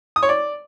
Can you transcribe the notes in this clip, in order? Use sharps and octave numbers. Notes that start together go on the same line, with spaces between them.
D#6
C#5
D5